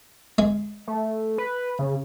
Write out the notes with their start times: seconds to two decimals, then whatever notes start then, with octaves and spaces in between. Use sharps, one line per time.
0.38 G#3
0.87 A3
1.38 B4
1.79 C#3